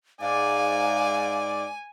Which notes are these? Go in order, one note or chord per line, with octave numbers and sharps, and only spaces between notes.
G#2 D5 F5 G#5